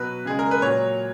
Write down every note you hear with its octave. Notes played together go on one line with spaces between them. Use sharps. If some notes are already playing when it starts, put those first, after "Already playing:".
Already playing: B2 F#3 B4
C#3 G#3 G#4
A#4
B4
A#2 F#3 C#5